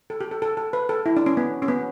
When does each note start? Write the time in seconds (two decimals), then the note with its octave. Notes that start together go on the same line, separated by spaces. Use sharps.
0.10 A4
0.21 G4
0.31 A4
0.42 A4
0.57 A4
0.73 B4
0.89 A4
1.06 E4
1.17 D4
1.26 C#4
1.37 B3
1.62 C#4
1.68 B3